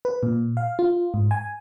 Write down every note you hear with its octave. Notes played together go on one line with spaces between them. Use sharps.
B4
A#2
F5
F4
G#2
G#5